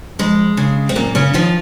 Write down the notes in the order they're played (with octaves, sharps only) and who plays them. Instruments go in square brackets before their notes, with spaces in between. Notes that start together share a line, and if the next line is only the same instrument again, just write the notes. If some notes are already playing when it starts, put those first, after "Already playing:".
[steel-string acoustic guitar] F2 G#3
C#3
C4
F#2 A#2 A#3
C#3 C#4
D#3 F3 F4